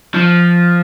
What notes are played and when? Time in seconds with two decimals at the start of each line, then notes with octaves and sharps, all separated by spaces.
0.15 F3